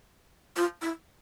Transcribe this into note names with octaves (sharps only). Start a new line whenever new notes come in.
F4
E4